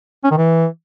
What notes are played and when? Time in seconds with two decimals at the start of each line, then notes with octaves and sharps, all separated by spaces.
0.24 C#4
0.31 D#3
0.37 E3